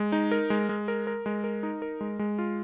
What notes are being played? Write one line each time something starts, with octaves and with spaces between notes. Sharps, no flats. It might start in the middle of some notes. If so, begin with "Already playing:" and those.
Already playing: G#3
D#4
A#4
G#3
G#3
A#4
A#4
G#3
A#4
D#4
A#4
G#3
G#3
F4